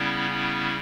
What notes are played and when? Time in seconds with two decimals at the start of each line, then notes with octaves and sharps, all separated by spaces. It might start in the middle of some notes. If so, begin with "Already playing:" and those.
Already playing: C#3 G3 B3 C#4 E4
0.30 C#4 E4